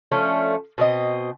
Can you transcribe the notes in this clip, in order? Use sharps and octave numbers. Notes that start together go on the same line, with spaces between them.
F3 A3 C#4 D4
B2 C4 D#5